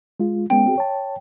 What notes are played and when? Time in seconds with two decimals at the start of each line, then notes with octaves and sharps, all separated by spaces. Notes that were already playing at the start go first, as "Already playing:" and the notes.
0.20 G#3 F4
0.50 G#3 B3 C#4 G5
0.66 C4 F#4 G#4
0.78 C#5 A5